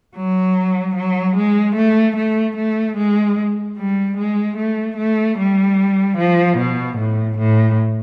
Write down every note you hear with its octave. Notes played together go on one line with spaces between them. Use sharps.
F#3
F#3
G#3
A3
A3
A3
G#3
G3
G#3
A3
A3
G3
F3
B2
A2
A2